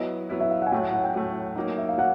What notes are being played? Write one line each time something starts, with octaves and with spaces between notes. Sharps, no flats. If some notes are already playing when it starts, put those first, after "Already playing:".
Already playing: F#3 B3 E4 D#5
F#3 B3 E4
E5
F5
F#5
G#5
A2 F#3 A3 G5
F#5
F#5
G5
A2 F#3 A3
F#3 A#3 D#4
E5
F5
F#3 A#3 F#5